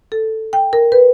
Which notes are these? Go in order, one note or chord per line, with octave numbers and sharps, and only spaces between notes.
A4
G5
A#4
B4